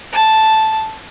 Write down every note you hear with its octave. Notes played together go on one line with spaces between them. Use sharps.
A5